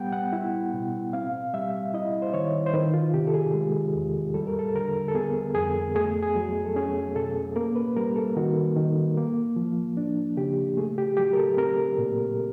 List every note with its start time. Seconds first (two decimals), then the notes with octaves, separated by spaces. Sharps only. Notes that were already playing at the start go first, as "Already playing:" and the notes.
Already playing: G3 B3 F#5 G5
0.13 F#5
0.33 E4
0.74 B2
1.13 C4 F5
1.54 G3 E5
1.94 E4 D#5
2.22 C5
2.34 D#3 C#5
2.66 C5
2.74 D#3 B4
2.94 F4
3.14 C3 G4
3.27 A4
3.34 G#4
3.54 G#3
3.95 E2
4.34 G3 A4
4.47 A#4
4.59 A4
4.75 D3 A#4
5.08 A4
5.15 B3 G#4
5.55 F2 G#4
5.95 A3 G#4
6.23 G#4
6.36 F#3
6.65 A4
6.76 C#4 G#4
7.15 B2 A4
7.56 A#3 A#4
7.76 B4
7.96 G3 A#4
8.16 A4
8.37 D#3 F#4
8.76 D#3
9.17 A#3
9.56 F3
9.97 D4
10.37 C#3 G4
10.77 A3 G#4
10.98 G4
11.17 F#3 G4
11.33 A#4
11.37 A4
11.57 C4 A#4
11.98 A#2